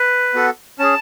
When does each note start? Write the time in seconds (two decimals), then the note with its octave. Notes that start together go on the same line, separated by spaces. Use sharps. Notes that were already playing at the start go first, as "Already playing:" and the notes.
Already playing: B4
0.34 B3 F#4 A4
0.79 C#4 G#4 A5